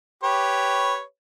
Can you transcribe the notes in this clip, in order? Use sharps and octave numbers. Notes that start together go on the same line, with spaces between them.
G4 B4 C#5